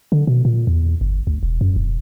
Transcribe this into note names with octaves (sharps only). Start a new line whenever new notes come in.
D3
B2
A#2
E2
G1
D2
E1
F#2
E1